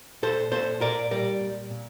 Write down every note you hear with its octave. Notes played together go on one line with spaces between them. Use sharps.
A#2 A4 C5
A#2 A4 C5
A#2 A#4 D5
G3 A#4 D5
A#2
A#2